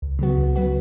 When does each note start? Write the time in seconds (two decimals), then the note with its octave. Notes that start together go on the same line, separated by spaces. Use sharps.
0.02 C#2
0.19 C#3 F#3 B3 F#4
0.38 C#2
0.55 C#3 F#3 B3 F#4